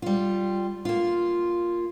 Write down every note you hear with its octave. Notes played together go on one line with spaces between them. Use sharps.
G3 F4
A#3 F4